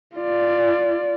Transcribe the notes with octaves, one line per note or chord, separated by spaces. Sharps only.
F4 D5